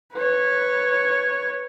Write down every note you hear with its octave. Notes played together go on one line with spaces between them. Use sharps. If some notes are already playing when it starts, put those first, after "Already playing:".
B4 C#5